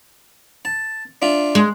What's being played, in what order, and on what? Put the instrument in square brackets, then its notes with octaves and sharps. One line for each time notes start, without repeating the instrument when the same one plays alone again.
[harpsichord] A5
D4 F4 E5
[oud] G#3